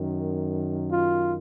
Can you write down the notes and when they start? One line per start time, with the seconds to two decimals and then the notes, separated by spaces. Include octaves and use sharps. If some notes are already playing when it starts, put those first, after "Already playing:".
Already playing: F#2 D#3
0.90 F4